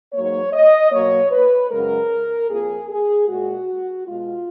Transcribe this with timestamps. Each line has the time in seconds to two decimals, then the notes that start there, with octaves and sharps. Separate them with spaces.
0.13 G#2 F#3 A#3 C#5
0.53 D#5
0.92 B2 F#3 A#3 C#5
1.32 B4
1.70 F#2 C#3 G#3 A#4
2.49 F2 F3 A#3 G#4
2.89 G#4
3.29 A#2 G#3 F#4
4.07 B2 G#3 F4